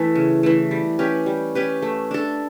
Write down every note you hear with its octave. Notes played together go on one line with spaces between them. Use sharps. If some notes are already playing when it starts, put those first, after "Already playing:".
Already playing: E3 A3
C#3
E3 A3
G3
C#4 G4 B4
G3
C#4 G4 B4
A3
D4 A4